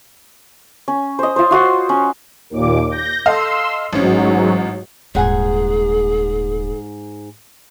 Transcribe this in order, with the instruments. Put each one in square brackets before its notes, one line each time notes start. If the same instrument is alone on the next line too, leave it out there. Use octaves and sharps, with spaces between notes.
[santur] C#4
C5 D#5
F4 C5
F4 F#4 C6
C#4
[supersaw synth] D#2 A#2 D6
G6 A#6
[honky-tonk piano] A4 D#5 F5 [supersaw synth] C6 E6
[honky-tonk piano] A1 C#4 [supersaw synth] G#2 F#3
[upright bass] D#1 [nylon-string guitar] G#2 F#5 G#5 [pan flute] G#4